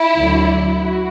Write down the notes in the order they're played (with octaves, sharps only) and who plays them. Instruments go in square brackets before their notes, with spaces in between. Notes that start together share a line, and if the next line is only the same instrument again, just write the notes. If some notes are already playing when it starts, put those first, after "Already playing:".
Already playing: [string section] E4
D2 D3 F#3
F#4